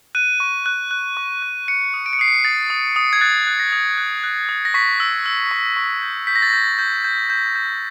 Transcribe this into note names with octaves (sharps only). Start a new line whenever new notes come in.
F#6 D#7
C#6
F#6
F#6
C#6
F#6
F#6 C#7
D#6
D7
C#7
D#6 C7
C#7
D#6 A6
D#6
D#6
G#6
F#6 A6
F#6
A#6
D#6
F#6
F#6
D#6
A#6
C#6 B6
E6
E6
C#6
C#6
G6
G6 B6
A#6
A6
G6 A#6
G6
G6
G6
G6